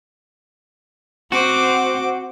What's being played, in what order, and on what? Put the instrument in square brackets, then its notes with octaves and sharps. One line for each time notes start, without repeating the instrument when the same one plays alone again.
[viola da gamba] C4 C5 [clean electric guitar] F#4 [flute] F#5 [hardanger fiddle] D6